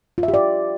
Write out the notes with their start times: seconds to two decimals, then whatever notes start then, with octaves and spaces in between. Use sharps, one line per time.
0.18 F4
0.23 E5
0.28 G4
0.34 D5